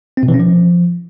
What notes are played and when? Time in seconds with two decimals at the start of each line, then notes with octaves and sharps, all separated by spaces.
0.17 C4
0.23 B2
0.28 E3
0.34 C#4
0.40 F3